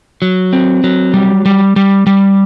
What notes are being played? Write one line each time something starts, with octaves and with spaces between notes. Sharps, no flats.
F#3
C4
F#3
G3
G3
G3
G3